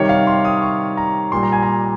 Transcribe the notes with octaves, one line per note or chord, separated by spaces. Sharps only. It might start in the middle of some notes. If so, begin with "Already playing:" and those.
Already playing: C3 D#3 G3 C#5
F5
C6
D#6
C#6
A#5
A#2 G3 C6
A#5
G#5
A#5